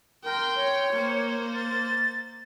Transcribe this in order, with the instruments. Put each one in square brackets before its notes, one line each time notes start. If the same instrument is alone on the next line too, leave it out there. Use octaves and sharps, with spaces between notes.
[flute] A#4 [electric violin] G5 C6
[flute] C#5
[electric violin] A#3 C5
[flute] A6